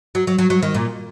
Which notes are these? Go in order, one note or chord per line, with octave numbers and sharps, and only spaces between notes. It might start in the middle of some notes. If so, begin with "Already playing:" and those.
F#3
F#3
F#3
F#3
D#3
A#2